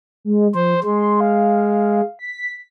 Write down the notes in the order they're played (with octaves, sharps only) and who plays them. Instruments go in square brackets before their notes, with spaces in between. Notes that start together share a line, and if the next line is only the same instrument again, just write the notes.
[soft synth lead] G#3
[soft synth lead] F3 [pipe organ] C5
[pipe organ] G#3 [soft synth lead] C6
[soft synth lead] F5
B6